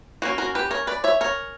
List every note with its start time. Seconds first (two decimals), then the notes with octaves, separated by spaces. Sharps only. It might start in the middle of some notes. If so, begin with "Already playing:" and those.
0.22 G3 A#3 C#4 F#4
0.38 F#4 A#4
0.55 G4 B4
0.71 A#4 C#5
0.87 B4 D5
1.04 C#5 E5
1.21 A#4 C#5